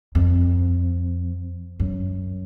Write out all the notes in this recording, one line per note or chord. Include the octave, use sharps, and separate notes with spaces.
F2
F#2